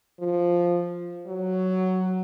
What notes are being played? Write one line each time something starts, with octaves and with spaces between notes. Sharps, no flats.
F3
F#3